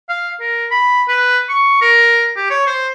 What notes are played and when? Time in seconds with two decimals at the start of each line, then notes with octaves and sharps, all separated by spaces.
0.09 F5
0.40 A#4
0.71 B5
1.08 B4
1.49 C#6
1.81 A#4
2.36 G4
2.50 C#5
2.67 C5